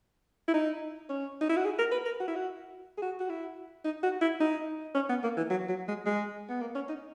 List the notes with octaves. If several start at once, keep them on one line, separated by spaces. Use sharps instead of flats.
E4
D#4
C#4
D#4
E4
F#4
G#4
A#4
B4
A#4
F#4
E4
F#4
G#4
F#4
F#4
E4
D#4
F#4
E4
D#4
C#4
B3
A#3
E3
F#3
F#3
G#3
G#3
B3
A#3
C#4
D#4